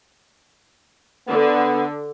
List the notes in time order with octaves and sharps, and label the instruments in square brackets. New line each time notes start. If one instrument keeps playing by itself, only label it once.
[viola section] D3 [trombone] B3